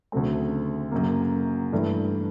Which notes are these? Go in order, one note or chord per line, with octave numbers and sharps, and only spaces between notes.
D2 C#3 F#3 A3 C4
F#2 C#3 F#3 A#3
G2 E3 A3 D4